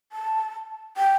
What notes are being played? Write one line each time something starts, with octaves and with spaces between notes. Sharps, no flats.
A5
G5